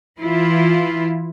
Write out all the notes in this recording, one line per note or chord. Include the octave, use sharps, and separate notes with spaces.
E3 E4 F4